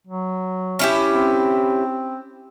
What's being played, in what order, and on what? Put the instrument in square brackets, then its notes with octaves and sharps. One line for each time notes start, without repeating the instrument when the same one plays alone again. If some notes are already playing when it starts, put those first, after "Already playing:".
[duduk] F#3
[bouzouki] C#4 E4 G4
[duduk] C4